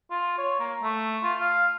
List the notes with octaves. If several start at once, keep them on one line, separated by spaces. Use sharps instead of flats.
F4
C#5
A#3
A3
F4
F5